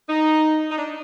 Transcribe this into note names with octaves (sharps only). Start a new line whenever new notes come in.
D#4
D#4
D4